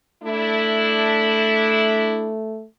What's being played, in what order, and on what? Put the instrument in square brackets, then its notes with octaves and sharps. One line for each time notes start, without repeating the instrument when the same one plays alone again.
[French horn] A3 [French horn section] D4 E4